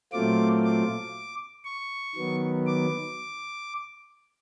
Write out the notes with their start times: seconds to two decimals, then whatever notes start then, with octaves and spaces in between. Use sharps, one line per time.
0.12 A#2 F#3 A3 C4 F4 D6
0.64 D6
1.65 C#6
2.16 D#3 F#3 B3
2.66 D6